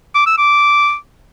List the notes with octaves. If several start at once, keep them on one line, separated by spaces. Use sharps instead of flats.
D6
E6
D6